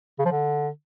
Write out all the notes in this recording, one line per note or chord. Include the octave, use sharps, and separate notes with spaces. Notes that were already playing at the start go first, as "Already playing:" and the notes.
C#3
F3
D3